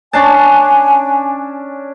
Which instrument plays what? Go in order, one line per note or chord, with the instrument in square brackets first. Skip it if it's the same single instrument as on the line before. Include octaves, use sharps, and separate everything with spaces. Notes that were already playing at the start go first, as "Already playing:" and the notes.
[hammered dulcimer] C#4 D4 A5 [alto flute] G#5